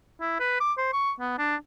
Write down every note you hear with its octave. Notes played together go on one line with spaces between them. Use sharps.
E4
B4
D6
C5
C#6
B3
D4